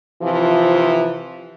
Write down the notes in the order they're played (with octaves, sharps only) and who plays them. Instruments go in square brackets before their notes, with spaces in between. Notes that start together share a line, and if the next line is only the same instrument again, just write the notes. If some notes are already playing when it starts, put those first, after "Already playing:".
[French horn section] C3 E3 F3